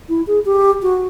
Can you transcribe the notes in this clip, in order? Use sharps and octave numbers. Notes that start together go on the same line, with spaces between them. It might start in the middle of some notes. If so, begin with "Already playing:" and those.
E4
G#4
G4
F#4